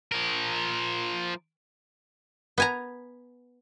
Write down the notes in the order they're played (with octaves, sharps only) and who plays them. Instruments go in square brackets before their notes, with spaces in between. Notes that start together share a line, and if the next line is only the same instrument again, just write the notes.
[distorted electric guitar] F3 A#4
[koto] B3 G#5 A#5